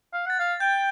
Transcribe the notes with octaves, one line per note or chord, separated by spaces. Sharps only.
F5
F#5 A6
F5
G5 G6